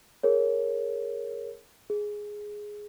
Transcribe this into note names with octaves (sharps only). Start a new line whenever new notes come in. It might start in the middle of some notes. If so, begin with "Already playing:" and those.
G#4 A#4 C#5
G#4